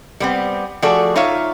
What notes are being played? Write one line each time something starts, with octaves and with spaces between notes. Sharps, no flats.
G3 B3 C4
F3 A3 F#4 G#4 A4 D5
D#4 F4 C#5 E5 F5